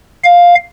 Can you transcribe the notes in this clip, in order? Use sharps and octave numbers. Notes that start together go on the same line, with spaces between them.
F5